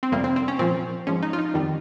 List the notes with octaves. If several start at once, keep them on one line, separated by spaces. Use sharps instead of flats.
C4
F2 C3 G3 A#3
C4
C4
C#4
A#2 F3 C4
G#2 F3 C#4
D#4
F4
D#4
F2 D#3 G3